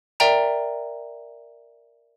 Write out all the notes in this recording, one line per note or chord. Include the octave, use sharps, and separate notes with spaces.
A#4 D5 E5 G5 A#5